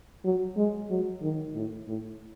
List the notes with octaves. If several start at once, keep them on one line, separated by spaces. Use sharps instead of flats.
F#3
G#3
F#3
D#3
A2
A2